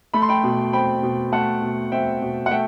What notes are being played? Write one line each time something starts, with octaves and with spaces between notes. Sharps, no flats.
A3 B5
C6
G5 B5
B2
C4 G5 B5
B2
A3 F#5 A5
B2
C4 E5 G5
B2
F#5
A3 E5 G5